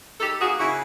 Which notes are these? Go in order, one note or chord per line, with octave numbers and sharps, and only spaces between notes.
D#4 G4 A4
A#3 F#4 G#4
C#3 E4 F#4